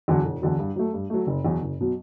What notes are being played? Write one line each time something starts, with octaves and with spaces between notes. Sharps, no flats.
E2 D3 F#3
E1
E2 D3 F#3
G2
F#3 A3
G2
F#3 A3
F#1
E2 B2 F#3
F#1
B2 F#3